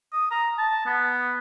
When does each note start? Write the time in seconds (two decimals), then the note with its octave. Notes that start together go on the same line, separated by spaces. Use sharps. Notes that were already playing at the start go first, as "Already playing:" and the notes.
0.13 D#6
0.31 A#5
0.58 A5
0.86 B3